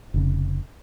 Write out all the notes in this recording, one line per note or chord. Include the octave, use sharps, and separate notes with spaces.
F1 C#3